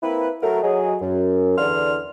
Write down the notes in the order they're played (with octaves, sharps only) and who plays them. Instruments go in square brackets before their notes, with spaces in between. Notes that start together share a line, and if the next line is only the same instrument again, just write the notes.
[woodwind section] A#3 C4 E4 B4
F#3 A3 A#4
F#3 G#4 D#5
F#2
E2 D3 E3 D5 C6 F6